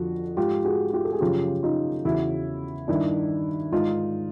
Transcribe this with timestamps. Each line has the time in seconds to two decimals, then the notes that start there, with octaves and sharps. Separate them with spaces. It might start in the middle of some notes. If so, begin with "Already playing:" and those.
Already playing: F2 D3 F3 F#4
0.37 G#2 F3 F4 G4
0.65 F#4 G#4
0.93 F4 G4
1.04 A4
1.13 G#4
1.20 F#2 C#3 F3 F4 G4
1.63 D#4 F4
2.05 E2 C#3 E3 E4 F#4
2.88 G2 D#3 D4 E4
3.72 G#2 D#3 D#4 F4